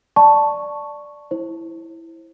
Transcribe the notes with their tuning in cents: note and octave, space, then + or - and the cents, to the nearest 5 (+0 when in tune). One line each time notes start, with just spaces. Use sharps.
D5 +0 A5 +0 C#6 +0
E4 +0 C5 +25